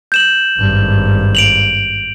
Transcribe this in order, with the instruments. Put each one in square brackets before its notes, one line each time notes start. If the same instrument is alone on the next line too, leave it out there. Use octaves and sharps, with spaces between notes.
[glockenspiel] G6 E7 F#7
[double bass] G#1 G2
[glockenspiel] D7 F7 F#7